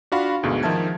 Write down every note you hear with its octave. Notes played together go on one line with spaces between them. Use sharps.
D4 F4 F#4 F5 B5
D2 G#2 B2 G#3
D#3 F3 E5 A5 G#6